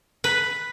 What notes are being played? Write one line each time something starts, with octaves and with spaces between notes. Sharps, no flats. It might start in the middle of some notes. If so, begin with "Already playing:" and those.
B4